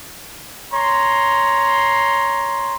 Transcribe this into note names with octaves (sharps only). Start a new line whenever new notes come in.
C#5 A#5 C6